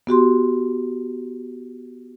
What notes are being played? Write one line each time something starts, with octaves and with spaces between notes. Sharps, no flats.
B3 F#4 G4 C6